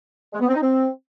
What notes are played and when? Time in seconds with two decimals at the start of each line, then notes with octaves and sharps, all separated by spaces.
0.33 G#3
0.40 B3
0.47 C4
0.54 D#4
0.61 C4